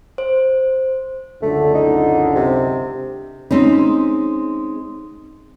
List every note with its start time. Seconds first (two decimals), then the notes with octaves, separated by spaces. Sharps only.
0.18 C5
1.42 C#2 F#2 D3 A3
1.75 D#4
2.36 C3
3.51 G#3 C4 C#4 D#4